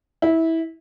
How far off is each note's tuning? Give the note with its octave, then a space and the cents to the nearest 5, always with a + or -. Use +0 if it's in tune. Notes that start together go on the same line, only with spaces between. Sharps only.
E4 -20